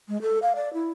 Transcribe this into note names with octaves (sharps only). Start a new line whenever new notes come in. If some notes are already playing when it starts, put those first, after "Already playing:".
G#3
A4
F5
D5
E4